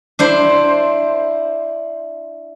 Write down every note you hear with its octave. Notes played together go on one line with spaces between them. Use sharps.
D4 E4 C5